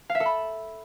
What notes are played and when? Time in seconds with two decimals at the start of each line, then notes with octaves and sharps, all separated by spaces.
0.09 F5
0.15 E5
0.20 A4
0.26 B5